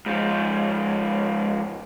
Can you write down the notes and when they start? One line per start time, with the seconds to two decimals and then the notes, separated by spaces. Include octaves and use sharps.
0.06 G#2 F3